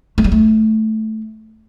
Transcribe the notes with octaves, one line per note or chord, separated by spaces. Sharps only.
A3
G3
A3